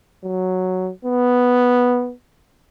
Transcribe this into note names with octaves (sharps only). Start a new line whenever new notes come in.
F#3
B3